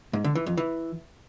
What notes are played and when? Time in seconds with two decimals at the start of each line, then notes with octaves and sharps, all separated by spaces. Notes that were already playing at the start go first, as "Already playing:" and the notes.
0.13 G#2
0.24 D3
0.35 E3
0.46 F2
0.57 E3